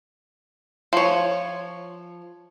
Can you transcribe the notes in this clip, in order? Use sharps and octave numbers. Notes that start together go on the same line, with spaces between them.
F3 C#5